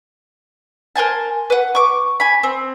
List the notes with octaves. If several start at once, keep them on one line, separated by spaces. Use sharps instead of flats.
A#4 C5 G#5 A5
B4 F#5
C#6 D6
G#5 B5
C4